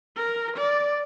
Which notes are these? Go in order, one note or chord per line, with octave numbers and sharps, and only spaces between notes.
A#4
D5